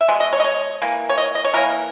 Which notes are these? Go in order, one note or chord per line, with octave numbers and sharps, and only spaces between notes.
E5
B2 G#3
D#5
C#5
D#5
C#5
E3 A#3
C#5
D#5
D#5
C#5
E3 A#3 A#4